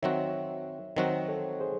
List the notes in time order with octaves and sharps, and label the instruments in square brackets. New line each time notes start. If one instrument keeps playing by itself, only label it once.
[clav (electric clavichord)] D#3 F#3 C4 F#4 [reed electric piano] C#5 E5
[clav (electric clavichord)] D#3 F#3 C4 F#4 [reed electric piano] C5 D#5
[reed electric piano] A4 C#5
G#4 C5